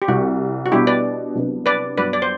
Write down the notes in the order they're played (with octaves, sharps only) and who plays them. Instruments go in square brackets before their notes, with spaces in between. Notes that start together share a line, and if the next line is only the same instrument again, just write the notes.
[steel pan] G4
[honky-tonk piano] C2 C3 G3 [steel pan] F#4
[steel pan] F#4
[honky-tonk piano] B2 G3 D4 [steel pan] E4 G4
[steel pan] B4 D5
[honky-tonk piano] C2 C3 F#3 B3 D4
[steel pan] B4 D5
[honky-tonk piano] G2 F#3 B3 [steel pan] B4 D5
[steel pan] D5
C5